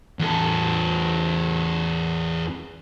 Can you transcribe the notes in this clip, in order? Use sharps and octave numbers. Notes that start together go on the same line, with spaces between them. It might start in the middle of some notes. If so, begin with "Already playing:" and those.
E2 A4